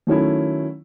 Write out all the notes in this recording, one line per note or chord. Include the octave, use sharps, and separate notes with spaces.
D#3 F#3 A3 C#4 E4